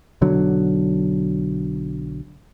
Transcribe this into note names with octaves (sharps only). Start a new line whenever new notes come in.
B1 D3 F#3